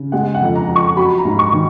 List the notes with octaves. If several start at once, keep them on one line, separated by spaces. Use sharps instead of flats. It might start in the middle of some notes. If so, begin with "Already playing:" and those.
Already playing: C#3
G#3 F#5
F#5
F2
A#5
F3
C#6
F#3 B5
A#5
G#2
C#6
D#3